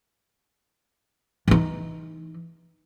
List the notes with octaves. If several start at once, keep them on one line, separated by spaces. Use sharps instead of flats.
E3 D#4